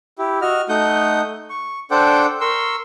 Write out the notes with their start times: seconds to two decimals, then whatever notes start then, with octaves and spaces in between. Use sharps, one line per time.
0.18 E4 G4
0.41 F#4 D#5 F6
0.69 A3 D#4 F#5 D#6 G6
1.50 C#6
1.91 D4 A4 C5 F#5 G5 D6
2.41 A#4 C6 C#6 E6